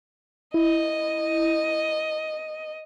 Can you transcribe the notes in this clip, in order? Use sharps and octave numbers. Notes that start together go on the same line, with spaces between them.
E4 D#5